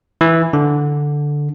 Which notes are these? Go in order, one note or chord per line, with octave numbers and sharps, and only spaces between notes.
E3
D3